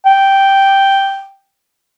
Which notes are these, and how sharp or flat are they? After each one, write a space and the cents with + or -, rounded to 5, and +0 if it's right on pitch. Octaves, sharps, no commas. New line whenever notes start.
G5 -5